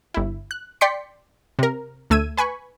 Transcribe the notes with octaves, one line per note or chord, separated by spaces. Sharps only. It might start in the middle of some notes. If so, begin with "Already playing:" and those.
G1 E4
F#6
D5 G5 C6 B6 C#7
C3 A#4
D2 A3 E6 G#6 D#7
B4 G#5 B5 C#6